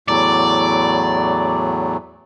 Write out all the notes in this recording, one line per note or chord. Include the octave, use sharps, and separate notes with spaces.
E2 A2 F#3 D5